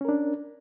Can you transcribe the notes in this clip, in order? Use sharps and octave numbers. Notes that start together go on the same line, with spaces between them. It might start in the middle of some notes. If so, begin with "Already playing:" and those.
C#4 D4 A#4